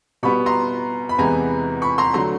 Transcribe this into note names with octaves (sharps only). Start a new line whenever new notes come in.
B2 G3 B3 B5 C#6
A#5 C6
B5
E2 C3 E3 G#3 B3 G#5 A#5
B5 C#6
A#5 C6
D3 F#3 A3 A#5 C6